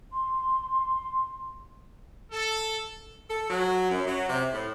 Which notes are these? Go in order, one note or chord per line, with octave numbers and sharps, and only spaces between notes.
C6
A4
A4
F#3
F#2
F#3
C3
A2